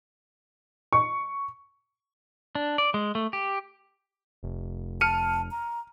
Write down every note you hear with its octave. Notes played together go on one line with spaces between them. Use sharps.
C#6
D4
D5
G#3
A3
G4
F1
A5 F6 C#7 D#7
A#5